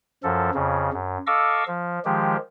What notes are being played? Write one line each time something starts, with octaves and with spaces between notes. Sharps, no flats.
F#2 F3 A4
F2 C#3
F#2
A4 D#5 F5 C#6 D6 E6
F3
D#3 F3 G#3 G4